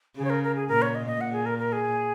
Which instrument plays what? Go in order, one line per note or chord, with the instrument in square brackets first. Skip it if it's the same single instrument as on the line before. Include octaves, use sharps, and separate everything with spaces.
[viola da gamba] C#3 [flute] G#4
[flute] C#5
A#4
A#4
G#4
[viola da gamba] A#2 [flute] A#4
[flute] C#5
D#5
D#5
[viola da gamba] A#2 [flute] F#5
[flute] G#4
A#4
A#4
G#4